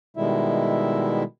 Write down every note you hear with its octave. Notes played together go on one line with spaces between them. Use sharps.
B2 D#3 G3 G#3 E4 E5